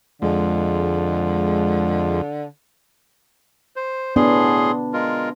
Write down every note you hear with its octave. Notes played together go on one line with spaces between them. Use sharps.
F2 D3 G#3
C5
A2 B3 D4 G#4 C6
G#3 F4 A#4